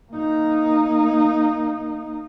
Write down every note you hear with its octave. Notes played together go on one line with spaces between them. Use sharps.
A#3 D#4